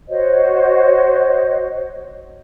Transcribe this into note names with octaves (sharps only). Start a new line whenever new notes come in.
F#4 C5 C#5 D#5